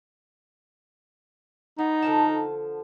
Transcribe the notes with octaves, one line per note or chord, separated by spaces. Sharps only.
B3 D#4
D3 F3 A5